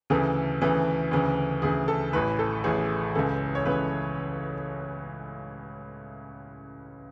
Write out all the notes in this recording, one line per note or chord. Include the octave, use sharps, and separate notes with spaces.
D2 C#3 E3 A4
D2 C#3 E3
D2 C#3 E3
D2 C#3 E3 G#4
A4
A1 A2 E3 B4
A4
A1 A2 E3 G#4
C#2 C#3 E3 A4
C#5
C#2 C#3 E3 B4